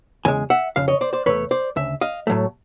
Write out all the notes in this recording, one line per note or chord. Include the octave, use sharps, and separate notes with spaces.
E2 C#3 G#3 G#5
E5 F#5
F2 C#3 F5
C#5 D#5
C5 D5
C5 D5
E2 C3 A3 B4 C#5
C5 D5
D2 C#3 E5
D#5 F5
A2 F#3 A3